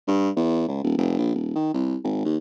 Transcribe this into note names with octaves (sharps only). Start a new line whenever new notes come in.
G2
E2
C#2
D#1
F1
A#1
D#1
D#3
C2
G#1
D#2